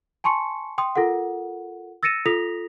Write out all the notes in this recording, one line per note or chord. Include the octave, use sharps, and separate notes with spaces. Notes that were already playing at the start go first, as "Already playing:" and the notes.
G#5 A5 C6 C#6 C#7
G5 C6 D#6
F4 A4 A#4 F#5
E6 A6 A#6 C#7 D#7 E7
F4 A4 D#6 A#6 B6 F7